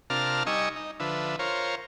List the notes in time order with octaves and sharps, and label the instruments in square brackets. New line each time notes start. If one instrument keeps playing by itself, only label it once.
[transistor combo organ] C3 D4 F4 A#4 A5 F6
G3 D#4 D#5 G#5 C#6 E6
D#4
D3 F3 B4 E5
F4 A#4 C5 C#5